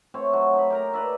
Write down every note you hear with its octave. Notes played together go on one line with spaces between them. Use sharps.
A3 C4 C#5
F#3
D#4 B5
G4 A#4 A#5
B4 D5 E5